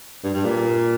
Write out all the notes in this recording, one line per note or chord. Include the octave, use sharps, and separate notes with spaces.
G2
G2
A#2